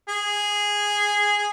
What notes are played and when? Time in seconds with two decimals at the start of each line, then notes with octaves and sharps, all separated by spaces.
0.09 G#4